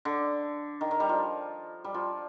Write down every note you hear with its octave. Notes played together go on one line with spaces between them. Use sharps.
D3
D#3
D#3
G3
F3
G3
F3